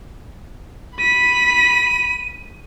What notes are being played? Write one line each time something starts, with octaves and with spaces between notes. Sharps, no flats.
B5 B6 D#7